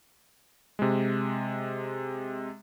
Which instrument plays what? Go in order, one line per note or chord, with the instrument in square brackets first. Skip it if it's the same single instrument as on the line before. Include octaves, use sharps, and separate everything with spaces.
[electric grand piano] C3 G#3